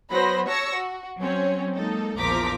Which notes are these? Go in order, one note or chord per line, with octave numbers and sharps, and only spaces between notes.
F#3 B3 B4 C5 B5 A#6
C#5 A5 C#6 E6 A#6 C#7
F#4
F#3 C4 C#4 C#5
G#3 A#3 D#4 A4
A#1 E2 F3 A#4 D6 B6